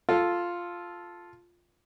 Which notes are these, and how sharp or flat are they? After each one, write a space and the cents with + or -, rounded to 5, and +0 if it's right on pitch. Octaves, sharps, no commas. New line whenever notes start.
F4 +0 A4 +0